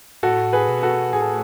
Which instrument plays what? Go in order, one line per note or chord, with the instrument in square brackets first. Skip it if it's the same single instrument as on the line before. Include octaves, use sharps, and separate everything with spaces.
[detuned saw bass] A2 [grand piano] F#4 A4
[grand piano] G#4 B4
[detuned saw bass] B2
[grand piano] F#4 A4
[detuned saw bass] A2 [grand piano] G#4
[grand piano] A4